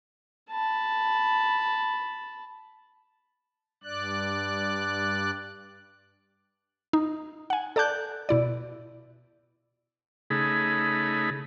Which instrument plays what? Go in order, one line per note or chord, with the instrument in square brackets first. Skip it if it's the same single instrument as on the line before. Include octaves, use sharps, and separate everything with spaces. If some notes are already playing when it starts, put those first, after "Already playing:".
[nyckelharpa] A5 B5
[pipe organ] G2 D5 F#6
[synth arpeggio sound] D#4
F#5 G#5
A4 D5 A5 D6 F#6 G6
B2 E4 D5
[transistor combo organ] C#3 A3 D#4 G#4 B5